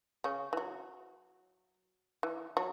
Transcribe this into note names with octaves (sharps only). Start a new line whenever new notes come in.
C#3 C#4
E3
F#3
E3
F#3